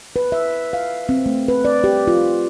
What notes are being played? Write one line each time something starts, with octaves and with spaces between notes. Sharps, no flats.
B4
E5
F5
C4
A3
B4
D5
G4
F4